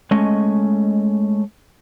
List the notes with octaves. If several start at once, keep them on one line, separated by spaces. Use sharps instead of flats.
G#3 A3 C#4 D#5